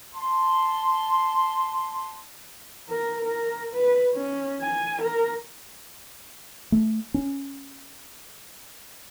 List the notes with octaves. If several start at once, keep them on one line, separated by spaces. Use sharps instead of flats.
A5 C6
A#4
A#4
B4
C#4
G#5
A#4
A3
C#4